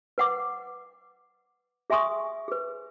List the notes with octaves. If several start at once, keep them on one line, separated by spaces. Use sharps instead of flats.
B4 F#5 D6
G#4 E5 G#5 C6 C#6 D#6
G#4 B4